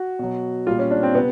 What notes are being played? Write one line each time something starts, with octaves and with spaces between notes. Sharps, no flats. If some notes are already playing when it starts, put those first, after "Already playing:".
Already playing: F#4
B2 F#3
A#2 G3 F4
C#4
D4
C4
C3 B3